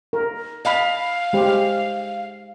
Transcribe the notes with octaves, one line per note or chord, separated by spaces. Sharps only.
A#4
D#5 F5 A5 B5
G#3 G4 C5